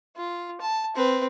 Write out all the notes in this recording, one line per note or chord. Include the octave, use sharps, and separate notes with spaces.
F4
A5
C4 B4